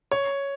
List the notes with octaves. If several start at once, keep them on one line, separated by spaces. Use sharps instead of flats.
C#5